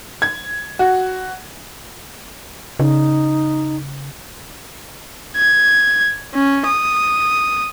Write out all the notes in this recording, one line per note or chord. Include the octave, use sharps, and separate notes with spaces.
G#6
F#4
C#3 D#4
G#6
C#4
D#6